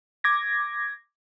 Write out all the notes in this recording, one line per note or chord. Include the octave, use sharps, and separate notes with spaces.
D6 G#6 A#6